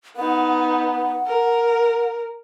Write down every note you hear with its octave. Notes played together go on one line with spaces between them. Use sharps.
B3 D#4 F#5
A#4